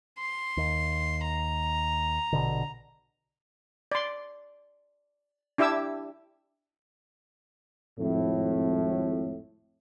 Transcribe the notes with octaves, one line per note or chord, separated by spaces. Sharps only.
C6
D#2
A#5
A#1 B2 D3
D5 C6
D4 E4 G4 E5 D6 E6
G#1 F2 A2